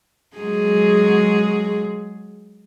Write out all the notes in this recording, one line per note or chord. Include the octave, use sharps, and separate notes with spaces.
F#3 G#3 G#4